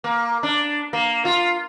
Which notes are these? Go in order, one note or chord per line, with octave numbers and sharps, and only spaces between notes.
A#3
D4
A#3
F4